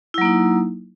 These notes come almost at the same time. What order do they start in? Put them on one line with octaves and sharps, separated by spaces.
E4 F#3 A#3 D#4